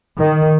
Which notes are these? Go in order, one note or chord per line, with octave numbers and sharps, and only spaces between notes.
D#3